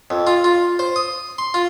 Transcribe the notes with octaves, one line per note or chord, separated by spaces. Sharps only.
F2
F4
F4
C5
D#6
C6
F4